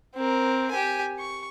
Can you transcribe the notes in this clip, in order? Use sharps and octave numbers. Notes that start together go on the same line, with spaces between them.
C4 A#4
G4 G#5
C#6